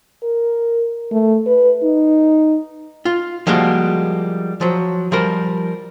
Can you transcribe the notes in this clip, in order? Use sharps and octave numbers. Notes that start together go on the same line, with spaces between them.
A#4
A3
B4
D#4
F4
F3 G3 G#3 A#3 F#4
F3 F#3
F3 G3 A#4